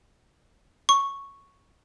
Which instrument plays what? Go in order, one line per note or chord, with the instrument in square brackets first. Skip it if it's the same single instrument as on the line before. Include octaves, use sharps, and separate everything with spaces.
[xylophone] C#6